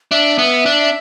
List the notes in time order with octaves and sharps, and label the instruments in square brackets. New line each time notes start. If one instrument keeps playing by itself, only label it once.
[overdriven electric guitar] D4 [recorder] E5
[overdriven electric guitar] B3
D4